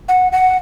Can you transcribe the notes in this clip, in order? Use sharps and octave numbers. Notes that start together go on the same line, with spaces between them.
F#5
F#5